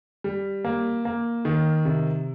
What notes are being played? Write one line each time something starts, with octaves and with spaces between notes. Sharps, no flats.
G3
A#3
A#3
D#3
C3